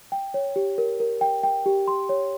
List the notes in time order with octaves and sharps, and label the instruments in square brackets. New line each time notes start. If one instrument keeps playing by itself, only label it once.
[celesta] G5
C#5
G4
A#4
A#4
G5
G5
G4
C6
C#5